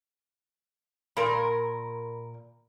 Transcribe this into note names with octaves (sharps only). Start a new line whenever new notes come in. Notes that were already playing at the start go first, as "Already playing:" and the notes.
A#2 A#4 B5 C6